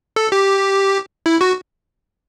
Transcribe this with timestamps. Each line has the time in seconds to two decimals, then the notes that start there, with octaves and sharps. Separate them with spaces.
0.16 A4
0.32 G4
1.26 E4
1.41 F#4